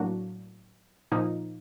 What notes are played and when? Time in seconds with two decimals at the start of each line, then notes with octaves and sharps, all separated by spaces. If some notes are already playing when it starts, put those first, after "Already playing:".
Already playing: A2 F#3 A#3 D4 F#4
1.12 A#2 F3 A#3 D#4